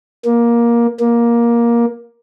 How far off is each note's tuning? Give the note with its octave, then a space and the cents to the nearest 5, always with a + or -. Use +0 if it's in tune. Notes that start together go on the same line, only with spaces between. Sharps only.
A#3 +15
A#3 +15